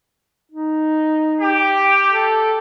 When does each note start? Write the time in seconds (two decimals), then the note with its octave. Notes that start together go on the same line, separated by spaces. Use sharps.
0.52 D#4
1.40 G4
2.13 A4